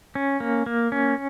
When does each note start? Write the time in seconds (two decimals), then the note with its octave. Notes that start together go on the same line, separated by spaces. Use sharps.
0.15 C#4
0.40 A#3
0.66 A#3
0.92 C#4